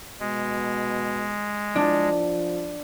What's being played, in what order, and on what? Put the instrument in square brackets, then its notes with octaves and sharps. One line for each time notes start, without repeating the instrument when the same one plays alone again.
[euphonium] B2 [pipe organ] G#3
[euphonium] F3 [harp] D4